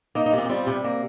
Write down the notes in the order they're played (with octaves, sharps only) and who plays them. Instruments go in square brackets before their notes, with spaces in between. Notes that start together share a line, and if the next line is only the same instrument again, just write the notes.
[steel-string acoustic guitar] A#3 D#4
D#4
C3
C4 F4
G4
G3 C4 F4
C3
A#3